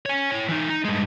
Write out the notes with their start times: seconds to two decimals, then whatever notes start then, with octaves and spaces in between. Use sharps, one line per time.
0.06 C#5 G#5
0.31 E4 C#5
0.49 E3 D#4
0.69 D#4
0.85 G2 G#3